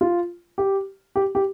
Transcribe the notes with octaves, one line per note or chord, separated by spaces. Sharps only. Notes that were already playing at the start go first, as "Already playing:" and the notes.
F4
G4
G4
G4